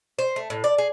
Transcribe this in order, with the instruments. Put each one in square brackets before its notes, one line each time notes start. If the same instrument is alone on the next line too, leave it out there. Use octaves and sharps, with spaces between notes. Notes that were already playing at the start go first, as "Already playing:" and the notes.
[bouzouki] C5
A3
A2
D5
G#4